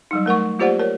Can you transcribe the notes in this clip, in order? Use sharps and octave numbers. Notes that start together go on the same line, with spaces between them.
F#3 G3 D#4
A3 A#4 F#5 C#6
A#3 F4 G4 C5 D5 F#5
A#4 C#5